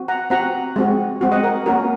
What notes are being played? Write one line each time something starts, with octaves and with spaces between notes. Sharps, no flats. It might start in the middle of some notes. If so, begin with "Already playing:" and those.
Already playing: C4 F#4
F#5 A#5
C4 F#4 F#5 A#5
G#3 C4 F#4
G#3 C4 F#4
D#5 F#5
A#4
A#3 C#4 F#4 A#4